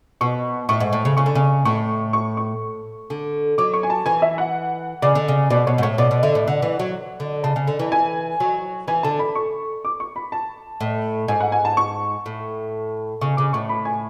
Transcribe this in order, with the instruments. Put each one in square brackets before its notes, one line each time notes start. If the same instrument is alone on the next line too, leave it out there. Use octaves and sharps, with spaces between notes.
[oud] B2 [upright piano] C#6
[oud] A2 [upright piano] C#6
[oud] G#2
A2
C#3
[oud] C#3 [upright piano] C#6
[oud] D3
C#3
[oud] A2 [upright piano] C#6
[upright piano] C#6
C#6
[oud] D3
[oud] F#3 [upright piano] D6
[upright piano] C#6
G#5
A5
[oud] E3 [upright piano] G#5
[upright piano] E5
F#5
[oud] C#3 [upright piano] D5
[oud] D3
C#3
[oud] B2 [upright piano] D5
[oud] B2 [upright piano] C#5
[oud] G#2
[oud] A2 [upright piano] C#5
[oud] B2 [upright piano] D5
[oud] B2
[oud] D3 [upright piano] E5
[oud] A2
[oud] D3 [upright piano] F#5
[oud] E3
F#3
D3
[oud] C#3 [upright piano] A5
[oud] C#3
D3
E3
[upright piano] G#5
[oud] F#3
[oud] E3 [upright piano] G#5
[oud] D3 [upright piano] A5
[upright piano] B5
C#6
D6
C#6
B5
A5
[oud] A2
[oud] G#2 [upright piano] G#5
[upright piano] F#5
G#5
A5
C#6
[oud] A2
[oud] C#3 [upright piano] C#6
[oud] C#3 [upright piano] D6
[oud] A2 [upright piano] C#6
[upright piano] B5
G#5